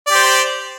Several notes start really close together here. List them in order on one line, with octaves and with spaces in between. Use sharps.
D5 G4 C5